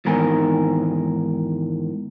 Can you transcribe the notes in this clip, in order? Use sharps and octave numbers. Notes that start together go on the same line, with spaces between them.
E2 G#2 D#3 A#4 G#5